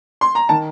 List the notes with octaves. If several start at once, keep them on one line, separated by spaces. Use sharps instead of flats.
C6
A#5
D#3 A5